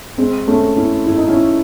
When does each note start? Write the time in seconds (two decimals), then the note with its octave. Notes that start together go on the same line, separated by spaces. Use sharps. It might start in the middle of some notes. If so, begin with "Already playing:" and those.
0.18 G#3 C4
0.47 A3 C#4
0.77 C#4 E4
1.07 E4
1.17 D#4
1.28 C#4 E4